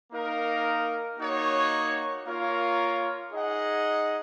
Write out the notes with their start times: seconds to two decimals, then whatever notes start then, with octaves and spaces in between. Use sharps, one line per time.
0.12 A#3 D#4 A#4 F5
1.19 A#3 D#4 F#4 C#5
2.25 A#3 F4 A#4 C#5 F5
3.31 D#4 G#4 D#5 F#5